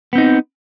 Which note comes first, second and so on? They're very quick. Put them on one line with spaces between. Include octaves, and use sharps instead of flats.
B3 C4 D#4